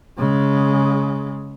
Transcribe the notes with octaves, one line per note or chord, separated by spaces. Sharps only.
C#3 G#3